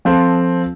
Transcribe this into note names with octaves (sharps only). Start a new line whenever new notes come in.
F3 C4 F4 A4